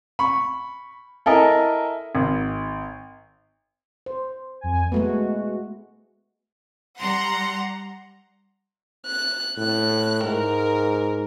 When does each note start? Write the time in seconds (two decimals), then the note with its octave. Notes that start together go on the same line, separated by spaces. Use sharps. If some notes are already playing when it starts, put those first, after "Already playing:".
0.19 B5 C#6
1.26 E4 A4 A#4 D#5 G#5
2.15 G#1
4.06 C5
4.61 F2 G#5
4.92 G#3 A3 B3 F#4
6.99 G3 F#5 A#5 C6
9.06 F#6
9.57 A2 F#6
10.24 G#2 A#4